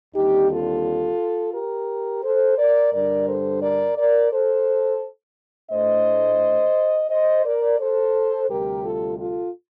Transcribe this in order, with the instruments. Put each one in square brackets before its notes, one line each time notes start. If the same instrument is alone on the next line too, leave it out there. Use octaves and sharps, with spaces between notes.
[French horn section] D#2 D3 G3 C4 D#4 G4
F4 A4
G4 A#4
A4 C5
A#4 D5
G2 D3 G3 D4 A#4 D5
A4 C5
A#4 D5
A#4 D5
A4 C5
A2 A3 D4 C5 D#5
C5 D#5
A#4 D5
A4 C5
D2 C3 G3 G4 A#4
F4 A4
F4 A4